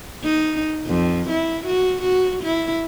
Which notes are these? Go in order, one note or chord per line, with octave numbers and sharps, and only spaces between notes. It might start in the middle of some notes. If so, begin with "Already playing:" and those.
D#4
F2
E4
F#4
F#4
E4